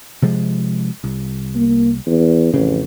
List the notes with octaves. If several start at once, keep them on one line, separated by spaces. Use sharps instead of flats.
C3 F3 G#3
C2
A#3
E2
A1 F2 C#3